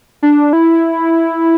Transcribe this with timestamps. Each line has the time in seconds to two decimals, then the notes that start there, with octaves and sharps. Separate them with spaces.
0.23 D4
0.53 E4